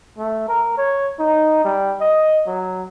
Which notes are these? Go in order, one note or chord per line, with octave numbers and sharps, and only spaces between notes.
A3
A#4
C#5
D#4
G3
D#5
F#3